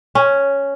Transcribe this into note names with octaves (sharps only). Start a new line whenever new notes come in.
C#4